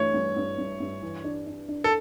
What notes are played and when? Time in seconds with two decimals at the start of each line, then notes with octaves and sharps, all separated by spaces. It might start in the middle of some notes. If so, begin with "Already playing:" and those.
Already playing: G2 E3 A3 C#5
0.14 G2
0.36 G2
0.58 G2
0.80 G2
1.02 E3
1.24 D4
1.47 D4
1.69 D4
1.84 A4